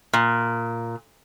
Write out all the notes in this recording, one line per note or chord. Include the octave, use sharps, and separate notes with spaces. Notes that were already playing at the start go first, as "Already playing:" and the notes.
A#2